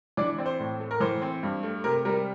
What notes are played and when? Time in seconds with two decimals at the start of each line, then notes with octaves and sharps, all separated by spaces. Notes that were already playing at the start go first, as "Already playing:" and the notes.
0.17 E3 D4 D5
0.38 C4 D5
0.46 C5
0.60 A2
0.80 A3
0.91 A#4
1.00 E3 C5
1.22 C4
1.43 G2
1.63 A3
1.84 C3 A#4
2.05 G3 A#4